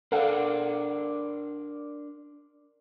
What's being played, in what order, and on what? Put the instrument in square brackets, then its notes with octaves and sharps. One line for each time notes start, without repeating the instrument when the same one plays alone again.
[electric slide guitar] D4 A#4 D5 [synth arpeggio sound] A4 F5 F#5